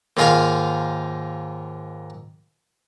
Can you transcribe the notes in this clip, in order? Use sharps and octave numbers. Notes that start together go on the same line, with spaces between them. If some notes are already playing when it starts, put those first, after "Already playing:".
D#2 G#2 F4 G#4 A#4 F5